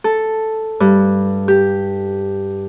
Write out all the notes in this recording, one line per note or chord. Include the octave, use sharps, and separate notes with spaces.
A4
G2
G4